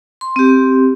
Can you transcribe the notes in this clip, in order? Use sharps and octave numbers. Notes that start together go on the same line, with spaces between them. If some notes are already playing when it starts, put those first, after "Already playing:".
C6
C4 G4